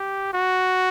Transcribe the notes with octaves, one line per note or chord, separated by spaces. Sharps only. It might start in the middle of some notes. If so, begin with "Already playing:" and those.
Already playing: G4
F#4